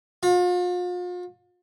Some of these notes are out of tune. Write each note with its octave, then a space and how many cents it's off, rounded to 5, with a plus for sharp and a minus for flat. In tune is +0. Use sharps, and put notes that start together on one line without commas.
F4 +40